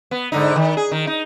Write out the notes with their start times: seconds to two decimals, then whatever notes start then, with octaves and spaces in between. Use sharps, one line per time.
0.11 B3
0.32 G#2 D3 D#4
0.56 D#3
0.77 G#4
0.91 D#3
1.07 D#4